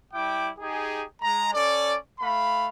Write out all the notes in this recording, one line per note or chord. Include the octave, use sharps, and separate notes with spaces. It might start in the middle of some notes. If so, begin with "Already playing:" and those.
G3 E4 G5 D6
D#4 G4 G#4
G#3 A#5
C#4 A4 D5
A3 F5 B5